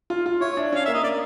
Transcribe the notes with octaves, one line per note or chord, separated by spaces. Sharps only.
F4
F4
E4 C#5
D4
C#4 F5
A#3 E5
D#5
A#3 D5